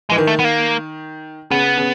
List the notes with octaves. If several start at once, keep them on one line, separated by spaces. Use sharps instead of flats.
E3 G#3
D#3
A3
B3
A#3
C#3 B3
C#3